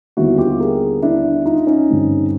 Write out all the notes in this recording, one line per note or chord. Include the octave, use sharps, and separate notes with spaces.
D#2 D3 G3 B3 E4 F#4
F4 G4
G#4 A#4
D4 E4
D#4 F4
C#4 D#4
G2 D3 G3 C4